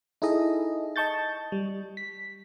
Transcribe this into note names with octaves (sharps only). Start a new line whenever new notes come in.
D#4 E4 G#4 A4 D#5
D#5 A5 C#6 G6 A6
G3
B6